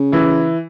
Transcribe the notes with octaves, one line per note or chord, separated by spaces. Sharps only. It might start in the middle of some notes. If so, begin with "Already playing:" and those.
Already playing: C#3
E3 E4